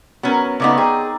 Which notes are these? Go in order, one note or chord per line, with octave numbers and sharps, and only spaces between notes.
F#3 B3 C#4 A#4
C#3 A3 B3 D#4 D5 D6
C4 G#4